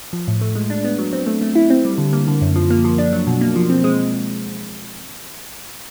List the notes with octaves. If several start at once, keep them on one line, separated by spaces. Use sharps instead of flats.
F3
A2
A3
G#3
D4
B3
F#3
C4
A3
A3
E4
C4
G3
D3
A#3
D3
F#2
F3
A#3
F3
D4
F#3
B2
A#3
F3
C4
G#3